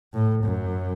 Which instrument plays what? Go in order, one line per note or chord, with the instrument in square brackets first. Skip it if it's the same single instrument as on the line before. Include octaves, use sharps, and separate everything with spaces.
[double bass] A2
F#2